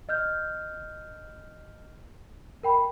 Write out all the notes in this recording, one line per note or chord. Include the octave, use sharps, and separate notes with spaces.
D#5 F6 G6
A#4 G5 B5